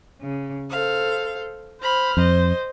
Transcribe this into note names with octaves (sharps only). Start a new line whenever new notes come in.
C#3
A4 C5 F5
C5 B5 F6
F2 C5 D#5